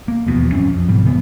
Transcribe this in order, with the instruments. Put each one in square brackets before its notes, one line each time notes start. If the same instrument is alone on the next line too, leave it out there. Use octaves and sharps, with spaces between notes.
[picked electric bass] A#3
D#1 A#1 E2 B2
G1 F#2 C4 C#4
F2
F#1 G#2 B2 G3
C3 E3 A3 B3